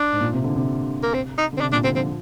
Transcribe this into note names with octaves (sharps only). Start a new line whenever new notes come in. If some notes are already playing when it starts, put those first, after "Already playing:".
Already playing: D4
G#2
A#2
C3
D3
C3
A#3
C4
D#4
D3
C4
C3 D4
A#2 D4
D3 C4
F3 C4